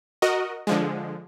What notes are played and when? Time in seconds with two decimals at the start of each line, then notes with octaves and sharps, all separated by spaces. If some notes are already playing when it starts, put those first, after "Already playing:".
0.22 F#4 A#4 D#5
0.67 D3 F3 G#3